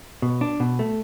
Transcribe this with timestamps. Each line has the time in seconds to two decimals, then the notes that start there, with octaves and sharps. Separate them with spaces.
0.22 B2
0.41 D4
0.60 B2
0.79 A3